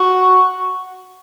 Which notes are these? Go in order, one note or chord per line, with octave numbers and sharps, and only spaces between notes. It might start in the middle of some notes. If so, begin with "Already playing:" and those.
Already playing: F#4 C#6